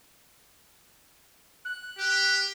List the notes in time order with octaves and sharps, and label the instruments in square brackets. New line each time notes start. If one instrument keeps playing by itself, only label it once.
[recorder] F#6
[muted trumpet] G4